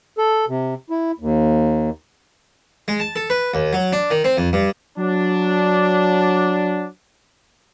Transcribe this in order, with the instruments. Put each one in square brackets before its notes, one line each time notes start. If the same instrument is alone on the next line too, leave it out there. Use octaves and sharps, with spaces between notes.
[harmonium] A4
C3
E4
D#2
[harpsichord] G#3
A5
A4
B4
D#2
F#3
D4
D#3
C4
F2
G2
[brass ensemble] F#3 D4